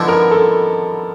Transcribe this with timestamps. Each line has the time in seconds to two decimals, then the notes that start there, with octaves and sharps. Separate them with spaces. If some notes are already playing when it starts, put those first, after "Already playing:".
Already playing: D3 F3 G#3 B3 E4
0.08 A#4
0.31 A4